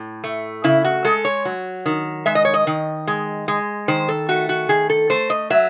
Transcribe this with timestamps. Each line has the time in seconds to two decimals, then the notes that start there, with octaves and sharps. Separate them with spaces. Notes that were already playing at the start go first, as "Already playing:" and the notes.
Already playing: A2
0.24 A3
0.64 C#3 E4
0.84 F#4
1.04 G#3 A4
1.25 C#5
1.45 F#3
1.86 D#3
2.26 G#3 E5
2.35 D#5
2.45 C#5
2.54 D#5
2.67 D#3
3.07 G#3
3.48 G#3
3.88 D#3 C5
4.08 A4
4.29 A3 F#4
4.49 F#4
4.69 D#3 G#4
4.90 A4
5.10 A3 C5
5.30 D#5
5.50 F#3 E5